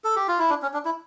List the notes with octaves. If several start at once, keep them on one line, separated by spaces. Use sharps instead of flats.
A4
G4
F4
E4
D4
C#4
D4
E4